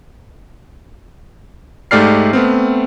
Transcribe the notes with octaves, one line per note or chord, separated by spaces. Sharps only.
G#2 A3 G4 D5 F6 C7
A3 B3 C4